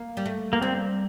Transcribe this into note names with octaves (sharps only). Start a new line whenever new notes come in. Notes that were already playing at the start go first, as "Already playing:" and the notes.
Already playing: A#3
G3
A3
A#3
G3 C4